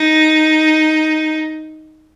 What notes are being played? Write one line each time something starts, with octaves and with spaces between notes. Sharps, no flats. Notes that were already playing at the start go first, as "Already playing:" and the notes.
Already playing: D#4